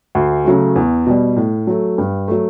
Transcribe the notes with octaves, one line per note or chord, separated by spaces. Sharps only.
D2
C#3 F#3 A3
E2
B2 G3
A2
F#3 A3
G2
F#3 A3